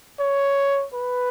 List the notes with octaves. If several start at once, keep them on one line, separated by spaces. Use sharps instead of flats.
C#5
B4